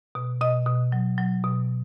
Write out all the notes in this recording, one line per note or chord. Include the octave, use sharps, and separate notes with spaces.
B2
B2 D#5
B2
F#3
F#3
B2